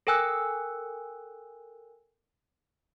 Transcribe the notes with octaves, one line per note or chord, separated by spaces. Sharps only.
A4 A#4 G5 G#5 E6 F#6